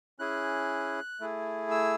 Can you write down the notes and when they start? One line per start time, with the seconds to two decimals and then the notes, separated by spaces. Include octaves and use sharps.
0.19 C#4 E4 G#4 F#6
1.20 A3 E4 G#4
1.71 E6